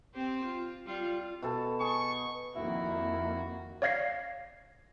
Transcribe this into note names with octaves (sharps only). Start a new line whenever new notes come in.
C4 G4 C5
F4
G3 F4
B2 A4 A5
G#4 C#6
F2 D#3 A#3 E4 F#4
C#5 D5 F5 G#6 A#6 C7